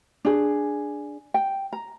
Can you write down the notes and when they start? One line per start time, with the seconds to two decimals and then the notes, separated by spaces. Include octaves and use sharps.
0.25 D4 G#4
1.34 G5
1.73 A#5